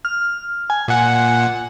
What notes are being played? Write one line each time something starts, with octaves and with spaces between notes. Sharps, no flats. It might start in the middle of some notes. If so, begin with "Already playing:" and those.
F6
G#5
A#2 F#5